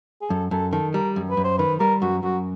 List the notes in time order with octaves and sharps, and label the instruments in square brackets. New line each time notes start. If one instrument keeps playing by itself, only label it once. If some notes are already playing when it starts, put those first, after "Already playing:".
[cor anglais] G#4
[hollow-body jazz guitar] F#2 [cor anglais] A4
[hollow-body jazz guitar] F#2 [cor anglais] A4
[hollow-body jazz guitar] D#3 [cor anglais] A4
[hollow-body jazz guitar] G3 [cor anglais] A#4
[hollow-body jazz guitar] F#2
[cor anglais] B4
[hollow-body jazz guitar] F#2
[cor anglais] C5
[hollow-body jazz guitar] D#3 [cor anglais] B4
[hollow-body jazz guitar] G3 [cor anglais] A#4
[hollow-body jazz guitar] F#2 [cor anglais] F#4
[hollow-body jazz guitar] F#2 [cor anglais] F#4